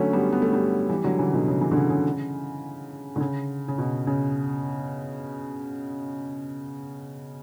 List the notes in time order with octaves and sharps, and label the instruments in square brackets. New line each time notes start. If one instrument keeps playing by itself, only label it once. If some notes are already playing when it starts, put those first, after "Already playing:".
Already playing: [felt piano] D3 F#3 A3 C#4
G3 B3
B3
A3
G3 B3
E3 G3
D3 F#3
C#3 E3
B2 D3
C#3
C#3 E3
D3
C#3
C#3
D3
C#3
C#3
B2
C#3